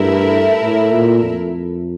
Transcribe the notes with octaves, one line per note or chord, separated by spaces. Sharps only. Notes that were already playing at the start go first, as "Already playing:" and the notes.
Already playing: G2 A3 E4 A#4 E5
A2
A#2
F2